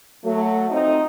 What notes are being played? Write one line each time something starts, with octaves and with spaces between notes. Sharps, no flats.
F#3 A3
F2 C4 D#4 D#5